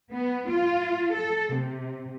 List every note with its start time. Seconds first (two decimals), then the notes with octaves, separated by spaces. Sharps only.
0.12 B3
0.49 F4
1.13 A4
1.53 C3